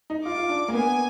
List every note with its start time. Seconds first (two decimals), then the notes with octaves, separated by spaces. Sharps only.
0.10 D#4
0.25 F4 D6
0.37 F4
0.49 D4
0.68 A#3
0.72 B3 G#5